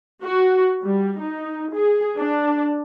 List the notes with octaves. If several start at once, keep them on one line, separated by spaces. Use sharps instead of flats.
F#4
G3
D#4
G#4
D4